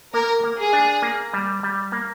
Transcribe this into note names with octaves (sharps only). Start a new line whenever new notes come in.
A#3 A#4
A#3
G#4
D4
A#3
G3
G3
A#3